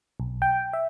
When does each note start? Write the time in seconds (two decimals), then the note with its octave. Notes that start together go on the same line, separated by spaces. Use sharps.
0.20 B1
0.42 G5
0.73 E5